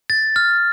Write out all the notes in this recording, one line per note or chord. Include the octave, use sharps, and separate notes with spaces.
A6
F6